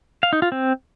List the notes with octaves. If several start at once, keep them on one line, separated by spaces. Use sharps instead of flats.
F5
D#4
F4
C4